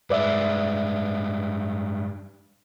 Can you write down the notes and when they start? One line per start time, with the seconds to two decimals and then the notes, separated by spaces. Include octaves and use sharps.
0.10 G2 G#3 B4 D5 E5